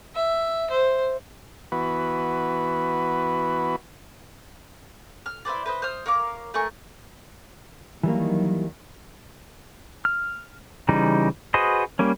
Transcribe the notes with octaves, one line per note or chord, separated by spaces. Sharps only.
E5
C5
E3 B3 F#4 B4
F6
E4 B4 C5 D5
B4 C5 D#5
C5 D#6 F6
A#4 C#5 F5 D6
A3 A#4 G#5 C#6
D#3 E3 F#3 G3 A#3
F6
C#3 E3 G3 D#4
F#4 G#4 B4 C5 D#5
G3 A#3 C#4